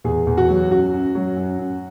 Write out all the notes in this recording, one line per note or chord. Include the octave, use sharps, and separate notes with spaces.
E2 G#4
E2
F#4
F#3
F#2 F#4
F#2
F#3
F#2
F#2